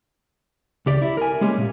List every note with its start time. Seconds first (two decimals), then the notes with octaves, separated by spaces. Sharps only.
0.86 C#2 G4 D5
1.02 E4
1.17 A#4 G#5
1.41 G#3 A#3 C#4 G4 G#4
1.58 A#2